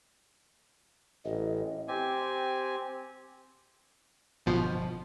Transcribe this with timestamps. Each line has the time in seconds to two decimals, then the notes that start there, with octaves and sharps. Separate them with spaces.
1.25 A1 D#5
1.88 C4 G4 G#5
4.46 G1 B2 F3